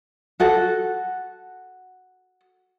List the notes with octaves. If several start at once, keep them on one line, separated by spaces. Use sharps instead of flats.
F#4 A4 F#5